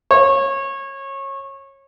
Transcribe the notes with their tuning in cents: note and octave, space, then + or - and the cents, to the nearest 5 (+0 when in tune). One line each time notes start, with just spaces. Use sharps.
C#5 -25